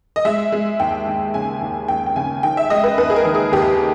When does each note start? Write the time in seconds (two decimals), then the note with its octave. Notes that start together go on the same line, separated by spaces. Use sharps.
0.16 D#5
0.25 G#3 E5
0.52 G#3
0.80 D#2 G5
1.07 D#2
1.34 C#3 G#5
1.61 D#2
1.88 D#2 G5
2.06 G5
2.16 C#3 G#5
2.43 D#3 G5
2.57 E5
2.70 G#3 D#5
2.84 B4
2.98 D#2 B4
3.10 G#4
3.16 A#4
3.25 D#3
3.35 G#4
3.52 D#2 G4